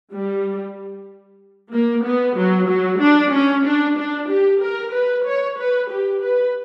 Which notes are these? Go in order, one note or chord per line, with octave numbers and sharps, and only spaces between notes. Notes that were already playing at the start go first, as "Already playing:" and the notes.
G3
A#3
B3
F#3
F#3
D4
C#4
D4
D4
G4
A#4
B4
C#5
B4
G4
B4